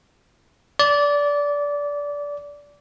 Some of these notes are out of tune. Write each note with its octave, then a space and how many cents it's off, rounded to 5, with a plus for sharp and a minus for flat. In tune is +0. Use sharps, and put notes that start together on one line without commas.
D5 -20